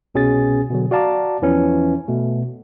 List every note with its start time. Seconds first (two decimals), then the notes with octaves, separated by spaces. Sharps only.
0.15 C2 B2 C#4 G#4 G#5 A6
0.70 B2 D3 F#3
0.91 F#4 D5 F5 A5 A#5 D6
1.42 E2 E3 F3 C#4
2.08 B2 A3